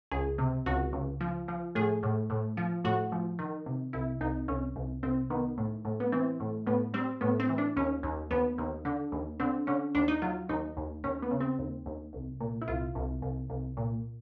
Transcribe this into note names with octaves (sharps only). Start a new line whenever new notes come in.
C#2 G#4
C3
C#2 F#4
C#2
F3
F3
A2 G#4
A2
A2
F3
A2 F#4
F3
D#3
C3
C2 E4
C2 D#4
C2 C#4
C2
C2 C4
D#3 B3
A2
A2
B3
E3 C4
A2
A2 B3
G3 C4
A2 B3
C4
E3
D4
D#2 C#4
D#2
D#2 B3
D#2
D3
D#2
D3 C4
D3 C#4
D#2 D4
D#4
F#3 F4
D#2 D#4
D#2
D#2 C#4
B3
C#3
C4
D#2
D#2
C2
A#2
E4
C2 F4
C2
C2
C2
A#2